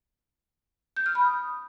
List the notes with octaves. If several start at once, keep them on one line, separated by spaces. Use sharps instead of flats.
G6
F6
B5
D#6